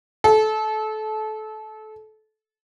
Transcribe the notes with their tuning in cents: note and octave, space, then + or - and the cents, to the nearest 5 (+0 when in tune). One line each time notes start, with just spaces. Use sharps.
A4 -25